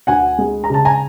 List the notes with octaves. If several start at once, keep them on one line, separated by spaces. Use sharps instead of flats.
D2 F#5 G#5
G#3
A#5
C#3 A5
G#5 A#5